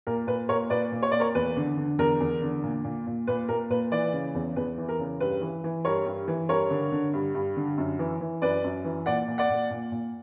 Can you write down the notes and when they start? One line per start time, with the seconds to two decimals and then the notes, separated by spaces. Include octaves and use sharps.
0.07 A#2 A#4
0.27 A#2 B4
0.49 A#2 A#4 C#5
0.70 A#2 B4 D5
0.92 A#2
1.02 C#5
1.11 A#2 D5
1.20 A#4 C#5
1.35 E2 B4
1.57 D3
1.77 D3
1.99 E2 A#4
2.20 E2
2.42 D3
2.64 A#2
2.84 A#2
3.07 A#2
3.27 A#2 B4
3.49 A#2 A#4
3.70 A#2 B4
3.92 E3 B4 D5
4.13 C#3
4.34 E2
4.56 E2 B4
4.78 E3
4.89 A#4
4.99 C#3
5.20 G2 B4
5.41 E3
5.64 E3
5.85 G2 A#4 C#5
6.06 G2
6.28 E3
6.49 G2 A#4 C#5
6.71 D3
6.92 D3
7.13 G2
7.35 G2
7.57 D3
7.78 F#2
7.99 E3
8.21 E3
8.42 F#2 B4 D5
8.64 F#2
8.85 E3
9.06 A#2 D5 F#5
9.28 A#2
9.38 D5 F#5
9.50 A#2
9.71 A#2
9.92 A#2